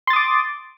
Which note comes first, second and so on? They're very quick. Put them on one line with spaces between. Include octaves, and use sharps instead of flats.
C6 A6 D#6 D6